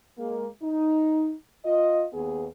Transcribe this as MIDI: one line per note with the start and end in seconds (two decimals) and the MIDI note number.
0.18 0.47 56
0.18 0.47 58
0.62 1.32 63
1.65 2.05 65
1.65 2.05 75
2.13 2.46 39
2.13 2.46 59
2.13 2.46 68